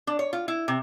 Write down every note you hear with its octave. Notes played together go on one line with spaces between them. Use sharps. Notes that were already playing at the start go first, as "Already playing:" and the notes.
D4
C#5
F4
E4
C3